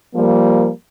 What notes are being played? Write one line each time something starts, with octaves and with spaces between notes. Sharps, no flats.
F3 G3 A#3